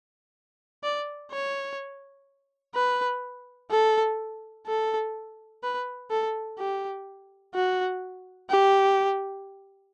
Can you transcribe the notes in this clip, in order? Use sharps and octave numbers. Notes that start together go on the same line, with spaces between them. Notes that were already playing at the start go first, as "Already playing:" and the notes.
D5
C#5
B4
A4
A4
B4
A4
G4
F#4
G4